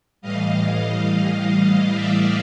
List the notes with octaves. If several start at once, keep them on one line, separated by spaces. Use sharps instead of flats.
A2 E3 G3 D#5 F5
D#5 F5
D5 E5